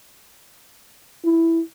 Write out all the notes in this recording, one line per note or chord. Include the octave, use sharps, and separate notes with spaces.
E4